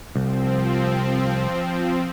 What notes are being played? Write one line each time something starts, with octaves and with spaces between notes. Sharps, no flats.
C2 F3 C4